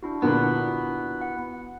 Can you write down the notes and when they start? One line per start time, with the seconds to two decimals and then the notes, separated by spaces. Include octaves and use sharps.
0.03 D4 E4 F#4
0.22 A#2 D3 B3 A#4
1.21 F#5